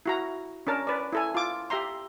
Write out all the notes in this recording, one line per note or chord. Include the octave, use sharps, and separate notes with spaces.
E4 F#4 A#5
C#4 D4 A#4 A5
B4 D5
E4 A4 G#5
F4 D6
G4 E5 A#5 C6